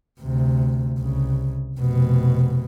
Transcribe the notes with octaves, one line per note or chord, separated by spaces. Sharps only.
D2 C3
C2 C#3
F1 B2